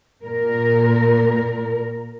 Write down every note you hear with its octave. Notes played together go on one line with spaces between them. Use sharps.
A#2 A#4